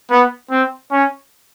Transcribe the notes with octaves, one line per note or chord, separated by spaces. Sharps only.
B3
C4
C#4